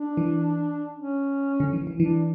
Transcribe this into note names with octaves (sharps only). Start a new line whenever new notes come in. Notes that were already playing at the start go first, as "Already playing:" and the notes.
Already playing: D4
E3
C#4
D3
E3
E3
E3 D4